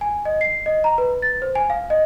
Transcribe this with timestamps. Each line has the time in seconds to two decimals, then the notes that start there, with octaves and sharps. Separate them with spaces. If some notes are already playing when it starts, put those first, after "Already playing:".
0.01 G#5
0.25 D#5
0.41 C7
0.66 D#5
0.84 A#5
0.98 B4
1.22 A6
1.42 C5
1.55 G#5
1.70 F5
1.90 D#5